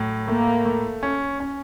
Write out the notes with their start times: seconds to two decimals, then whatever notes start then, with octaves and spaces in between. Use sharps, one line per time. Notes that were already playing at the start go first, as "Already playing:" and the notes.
Already playing: A2 F#3
0.28 A3 A#3
0.65 A3
1.03 C#4
1.40 C#4